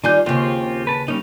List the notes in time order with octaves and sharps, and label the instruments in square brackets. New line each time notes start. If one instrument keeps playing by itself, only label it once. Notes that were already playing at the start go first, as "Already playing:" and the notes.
[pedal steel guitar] D#3 G#5 G6 [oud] G3 F4 D5
[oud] D#2 C#3 [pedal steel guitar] C4 F4 G4
[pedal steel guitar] B4 A5
[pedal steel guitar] G3 C#4 D#4 [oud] A#3